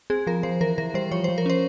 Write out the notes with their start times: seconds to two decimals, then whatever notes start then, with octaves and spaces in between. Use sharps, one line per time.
0.10 C4 G#4
0.27 F3 A#4
0.43 F3 C5
0.61 E3 A#4
0.78 E3 A#4
0.94 G3 C5
1.11 F3 C#5
1.24 F3 C5
1.38 A#4
1.46 C#4 C5